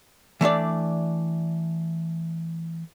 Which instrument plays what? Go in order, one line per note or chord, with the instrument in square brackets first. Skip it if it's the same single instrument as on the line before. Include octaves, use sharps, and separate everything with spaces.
[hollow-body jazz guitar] E3 A3 D4 D5